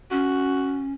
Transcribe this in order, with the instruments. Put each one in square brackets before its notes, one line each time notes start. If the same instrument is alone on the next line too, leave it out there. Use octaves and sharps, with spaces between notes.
[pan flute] C#4 [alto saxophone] F#4